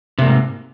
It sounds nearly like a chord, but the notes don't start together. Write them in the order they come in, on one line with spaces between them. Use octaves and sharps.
C3 A#3 G#2